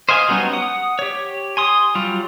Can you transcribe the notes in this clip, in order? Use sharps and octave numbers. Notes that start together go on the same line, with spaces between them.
C5 D#5 F5 G#5
F#3 G3 B3 C#4 D#4
F#5 D#6
G4 C#5
G#5 C6 D#6
F#3 G3 F4